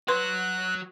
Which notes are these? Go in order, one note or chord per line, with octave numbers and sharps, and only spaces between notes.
F#3 F#4 B4 C6 F#6